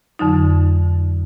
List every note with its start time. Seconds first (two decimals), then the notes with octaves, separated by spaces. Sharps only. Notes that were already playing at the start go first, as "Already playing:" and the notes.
0.19 F2 D3 F#3 D#4